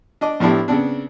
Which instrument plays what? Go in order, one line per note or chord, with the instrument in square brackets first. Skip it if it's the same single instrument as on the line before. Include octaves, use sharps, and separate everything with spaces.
[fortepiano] D4 D#5 D6
A2 F3 B3 D4 E4 G4
C#3 B3 C4 D4